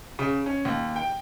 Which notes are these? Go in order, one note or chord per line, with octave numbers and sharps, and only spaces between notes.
C#3
C#4
D#2
G5